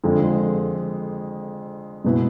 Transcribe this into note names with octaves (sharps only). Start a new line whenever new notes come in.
F2 D3 F3 G#3
B2 G#3 B3 E4